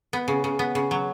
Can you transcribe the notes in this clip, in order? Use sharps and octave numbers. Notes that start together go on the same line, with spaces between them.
B3
C#3
C#3
B3
C#3
F#3